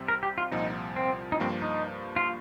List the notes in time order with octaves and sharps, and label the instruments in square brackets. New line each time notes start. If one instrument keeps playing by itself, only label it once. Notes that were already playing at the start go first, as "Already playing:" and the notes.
Already playing: [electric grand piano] C2 C3 G3 C4
[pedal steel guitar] A#4
G4
F4
[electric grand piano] C2 A#2 F3 [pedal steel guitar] D#4
[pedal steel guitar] C4
D#4
[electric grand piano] G2 F3 A#3 [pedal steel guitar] C4
[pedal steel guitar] D#4
F4